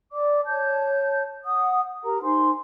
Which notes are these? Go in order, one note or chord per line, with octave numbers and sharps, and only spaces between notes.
D5 D6
C#5 A5 G6
F#5 D#6
G4 A#4 A#5
D#4 C5 G#5 C6